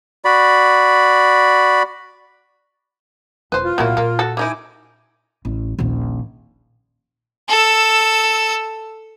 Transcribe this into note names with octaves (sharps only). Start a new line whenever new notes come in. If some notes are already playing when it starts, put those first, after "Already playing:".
F#4 D5 B5
E1 E4 B4 C5
F4
B1 A#2 F#3 A#3 E4
A#2 A#3
F#4 A4
G3 D#4 E4 G#5 D6
A1
D#1 A#1
A4 E6